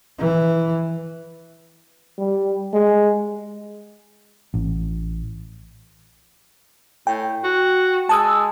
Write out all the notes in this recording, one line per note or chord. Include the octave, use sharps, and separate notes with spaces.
E3
G3
G#3
A1
A2 G5
F#4
G#3 A5 D#6 E6